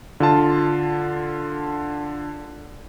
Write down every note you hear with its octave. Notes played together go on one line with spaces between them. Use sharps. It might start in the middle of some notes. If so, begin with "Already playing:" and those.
D3 F4 A5